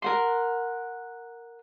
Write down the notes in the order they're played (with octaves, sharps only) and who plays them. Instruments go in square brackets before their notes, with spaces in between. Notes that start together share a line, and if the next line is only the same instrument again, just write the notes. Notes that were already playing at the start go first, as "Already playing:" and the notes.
[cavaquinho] A#4 F#5 C6